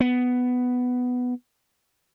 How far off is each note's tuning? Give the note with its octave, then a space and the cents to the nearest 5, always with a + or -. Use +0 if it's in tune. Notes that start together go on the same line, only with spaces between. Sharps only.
B3 +10